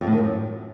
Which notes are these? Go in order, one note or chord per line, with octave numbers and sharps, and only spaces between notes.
F2
A2
D#3
F2
F#2